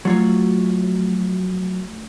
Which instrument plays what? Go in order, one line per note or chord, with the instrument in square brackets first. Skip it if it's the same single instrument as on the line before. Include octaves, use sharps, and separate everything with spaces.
[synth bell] F3 A3 F#4 [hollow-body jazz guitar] F#3 F4 C#5